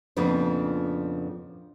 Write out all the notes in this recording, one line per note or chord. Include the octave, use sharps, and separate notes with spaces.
F2 A#2 C#3 F3 B3 D4